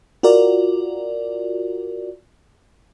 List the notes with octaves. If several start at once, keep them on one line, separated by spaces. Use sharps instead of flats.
F4 F#4 A#4 D5